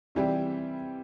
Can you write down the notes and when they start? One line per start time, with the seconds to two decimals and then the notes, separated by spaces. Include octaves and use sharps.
0.15 C3 E3 G3 C4 G4